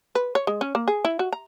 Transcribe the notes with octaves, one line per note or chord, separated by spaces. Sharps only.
B4
C#5
G#3
C#4
A#3
G#4
E4
F#4
A#5